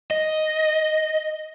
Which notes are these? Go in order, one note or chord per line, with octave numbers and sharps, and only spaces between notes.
D#5